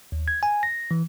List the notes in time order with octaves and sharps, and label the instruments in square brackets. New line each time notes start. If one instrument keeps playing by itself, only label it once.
[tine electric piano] D#2
G#6
G#5
A#6
E3